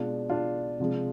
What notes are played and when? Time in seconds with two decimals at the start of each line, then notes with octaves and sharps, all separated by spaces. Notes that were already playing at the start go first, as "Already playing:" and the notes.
Already playing: B2 G#3 D4 F4
0.30 D4 F4
0.80 C3 F3 G#3